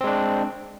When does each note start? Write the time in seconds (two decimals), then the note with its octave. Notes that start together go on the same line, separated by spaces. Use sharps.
0.01 C4
0.04 G#3
0.07 D4